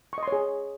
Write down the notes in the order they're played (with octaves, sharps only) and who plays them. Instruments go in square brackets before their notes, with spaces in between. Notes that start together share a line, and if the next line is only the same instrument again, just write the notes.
[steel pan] C#6
D#5
C6
C#5
G#4